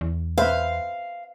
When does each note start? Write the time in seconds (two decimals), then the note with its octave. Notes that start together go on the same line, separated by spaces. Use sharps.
0.01 E2
0.38 B4 C5 E5 F5